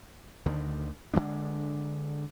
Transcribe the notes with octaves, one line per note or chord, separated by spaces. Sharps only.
D2 D3 D#3
D3 E3 G#3 D4